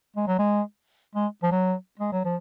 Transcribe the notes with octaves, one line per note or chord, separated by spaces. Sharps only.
G#3
F#3
G#3
G#3
F3
F#3
G#3
F#3
F3